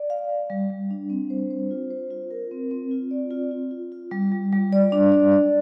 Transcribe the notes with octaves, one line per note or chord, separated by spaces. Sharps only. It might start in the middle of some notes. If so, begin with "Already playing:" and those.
Already playing: D5
F5
F5
G3
G3
D4
C4
C5
C5
F4
C5
F4
A#4
C4
C4
F4
D5
F4
F4
F4
F4
G3
G3
G3
D5
D4
D5
D5